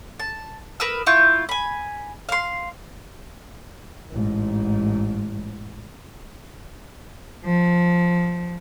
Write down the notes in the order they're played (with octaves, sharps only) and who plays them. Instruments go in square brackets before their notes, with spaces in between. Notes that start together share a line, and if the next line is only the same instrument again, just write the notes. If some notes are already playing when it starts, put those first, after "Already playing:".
[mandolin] A5
A#4 B4 D#6 E6
E4 F4 C#6 G6
G#5 B5
F5 C6
[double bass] A1 G#2
[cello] F3